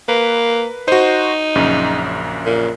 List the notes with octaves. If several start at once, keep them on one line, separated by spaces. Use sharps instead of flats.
A#3 B4
D#4 F#4 C5
A#1 F#2 C#3
A#2